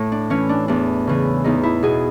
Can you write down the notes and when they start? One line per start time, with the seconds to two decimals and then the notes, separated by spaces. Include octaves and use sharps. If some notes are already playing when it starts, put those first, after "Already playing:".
Already playing: A2
0.12 D4
0.30 E3 C#4
0.49 D4
0.68 E2 D4
1.07 C#3 E3
1.44 E2 D#4
1.63 E4
1.83 B2 G#4